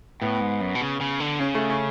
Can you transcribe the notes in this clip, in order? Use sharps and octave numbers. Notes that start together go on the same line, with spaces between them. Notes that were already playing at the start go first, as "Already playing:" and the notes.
A2 B3
G#2
F#2
B2
C#3
C#3
D3
C#3 C#4
A3
C#4